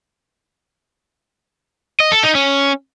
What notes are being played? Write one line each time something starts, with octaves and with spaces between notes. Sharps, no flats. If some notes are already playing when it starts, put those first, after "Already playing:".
D#5
A4
D#4
C#4